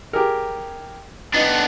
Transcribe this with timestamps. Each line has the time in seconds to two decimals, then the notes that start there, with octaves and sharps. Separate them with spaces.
0.13 G4 G#4 A#4
1.34 B3 D4 D#4